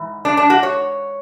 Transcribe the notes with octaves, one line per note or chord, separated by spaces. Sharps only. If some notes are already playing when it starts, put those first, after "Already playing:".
Already playing: G#2 E3
D4
D4
F#4
C#5